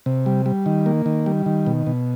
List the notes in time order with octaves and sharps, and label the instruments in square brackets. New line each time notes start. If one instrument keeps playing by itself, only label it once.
[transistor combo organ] C3
G3
G3
D#3
A#3
D#3
G3
D#3
B2
B2